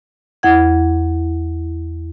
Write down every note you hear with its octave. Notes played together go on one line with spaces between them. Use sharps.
E2 E4 F#5 G#6